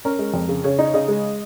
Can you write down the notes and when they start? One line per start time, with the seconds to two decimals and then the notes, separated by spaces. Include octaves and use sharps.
0.05 C#4 A#4
0.19 G#3
0.34 F2
0.49 C#3
0.64 C#3 C#5
0.79 D#4
0.94 C#3 D#5
1.08 G#3